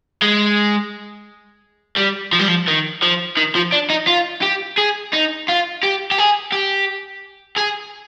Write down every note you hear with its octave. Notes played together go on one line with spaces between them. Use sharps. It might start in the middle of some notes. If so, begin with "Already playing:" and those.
G#3
G3
F3
G3
F3
D#3
F3
D#3
F3
D4
D#4
F4
G4
G#4
D#4
F4
G4
G4
G#4
G4
G#4